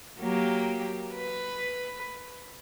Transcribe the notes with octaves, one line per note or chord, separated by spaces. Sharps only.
F#3 A#3 G4
B4